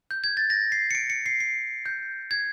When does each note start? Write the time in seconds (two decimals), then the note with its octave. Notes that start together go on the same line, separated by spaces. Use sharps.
0.11 G6
0.24 G#6
0.37 A6
0.50 A#6
0.72 C7
0.91 C#7
0.95 D7
1.10 C#7
1.26 C7
1.40 C7
1.86 G6
2.31 G#6